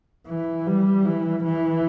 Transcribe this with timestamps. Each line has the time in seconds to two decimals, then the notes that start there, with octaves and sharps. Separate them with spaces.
0.28 E3
0.67 G3
1.06 E3
1.44 E3